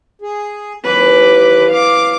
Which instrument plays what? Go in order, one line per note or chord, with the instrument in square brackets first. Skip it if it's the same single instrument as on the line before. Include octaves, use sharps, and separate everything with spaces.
[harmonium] G#4
[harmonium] D#2 [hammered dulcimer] C3 E3 F#3 [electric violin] B4 D6
[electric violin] F5 D6